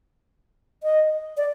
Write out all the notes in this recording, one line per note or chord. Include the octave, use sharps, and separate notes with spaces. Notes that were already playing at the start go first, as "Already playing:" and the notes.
D#5
D5